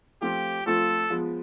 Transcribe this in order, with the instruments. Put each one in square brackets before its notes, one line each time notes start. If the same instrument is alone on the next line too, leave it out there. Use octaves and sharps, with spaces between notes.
[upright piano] F3 A3 C4 F4 [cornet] G4
[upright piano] F3 A3 C4 F4 [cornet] A4
[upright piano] F3 G#3 B3